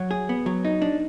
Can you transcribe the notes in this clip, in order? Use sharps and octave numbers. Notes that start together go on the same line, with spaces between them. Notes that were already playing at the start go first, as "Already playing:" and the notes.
Already playing: F#3
G#4
B3
F#3
D#4
D4